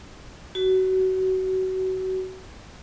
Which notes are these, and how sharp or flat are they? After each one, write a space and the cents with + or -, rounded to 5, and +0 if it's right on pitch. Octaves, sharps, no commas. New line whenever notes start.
F#4 +25